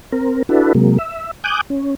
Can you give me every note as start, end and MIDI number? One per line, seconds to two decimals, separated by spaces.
0.12 0.42 60
0.12 0.42 70
0.49 0.73 62
0.49 0.73 64
0.49 0.73 66
0.49 0.73 69
0.49 0.73 71
0.75 0.98 48
0.75 0.98 54
0.75 0.98 56
0.75 0.98 58
0.98 1.31 76
1.44 1.61 80
1.44 1.61 86
1.44 1.61 87
1.44 1.61 90
1.44 1.61 91
1.70 1.95 61